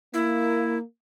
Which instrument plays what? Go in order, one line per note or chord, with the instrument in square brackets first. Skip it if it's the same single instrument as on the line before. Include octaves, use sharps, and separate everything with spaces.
[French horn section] A#3 [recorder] E4